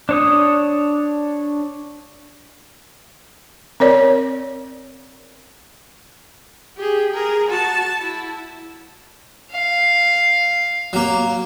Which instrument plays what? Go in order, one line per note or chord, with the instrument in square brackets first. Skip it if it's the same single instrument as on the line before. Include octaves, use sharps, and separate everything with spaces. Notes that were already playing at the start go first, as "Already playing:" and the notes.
[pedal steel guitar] D4 C#5 D#6
[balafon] C4 A#4 C#5 D5
[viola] G4 G#4
G#4 A#4
F#4 A5
E4
[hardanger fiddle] F5
[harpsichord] F#3 A#3